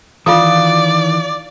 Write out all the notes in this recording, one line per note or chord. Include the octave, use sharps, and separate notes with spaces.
D#3 E3 F4 D5 F5 D#6